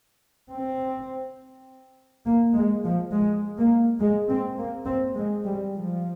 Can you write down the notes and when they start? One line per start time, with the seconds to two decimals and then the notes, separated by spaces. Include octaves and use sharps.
0.52 C4
2.26 A#3
2.55 G#3
2.83 F3
3.12 G#3
3.56 A#3
4.00 G#3
4.29 C4
4.58 A#3
4.86 C4
5.16 G#3
5.45 G3
5.74 F3